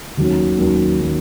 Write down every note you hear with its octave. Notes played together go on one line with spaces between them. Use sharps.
D#2 D#3 F#3 C#4
D#2 D#3 F#3 C#4
D#3 F#3 C#4